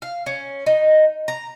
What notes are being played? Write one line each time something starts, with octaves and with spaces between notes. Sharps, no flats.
F5
C#4
D#4
A#5